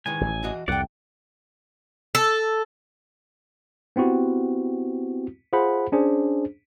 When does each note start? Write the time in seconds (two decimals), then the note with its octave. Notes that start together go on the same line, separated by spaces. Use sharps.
0.06 D#3 E3 G#3 G#5
0.21 A1
0.43 E3 F#4 D#5
0.68 C2 F2 C#5 D5 F#5 G5
2.15 A4
3.96 B3 C4 E4 F#4 G4
5.53 F4 G#4 C5 F#5 B5
5.92 C#4 D4 G#4 C5